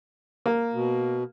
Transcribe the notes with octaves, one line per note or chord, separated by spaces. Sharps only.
A#3
B2